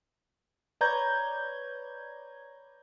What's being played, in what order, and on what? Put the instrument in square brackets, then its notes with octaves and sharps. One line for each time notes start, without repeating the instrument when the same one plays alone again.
[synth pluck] B4 C#5 D5 A#5 G6 G#6